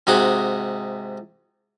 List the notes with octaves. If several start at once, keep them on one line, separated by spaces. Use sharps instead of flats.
G#2 C3 D#4 F#4 G#4 F#5